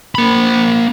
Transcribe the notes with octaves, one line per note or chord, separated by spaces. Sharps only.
A#3 B5